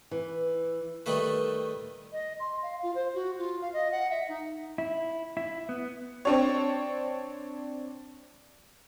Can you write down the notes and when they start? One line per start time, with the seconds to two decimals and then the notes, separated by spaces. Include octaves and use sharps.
0.11 E3
1.06 D#3 G3 A3 B4
2.12 D#5
2.40 C6
2.62 F5
2.83 F4
2.95 C5
3.14 F#4
3.39 F4
3.61 F5
3.73 D#5
3.92 F#5
4.10 E5
4.29 D#4
4.78 E4
5.37 E4
5.69 B3
6.25 C4 D4 C#5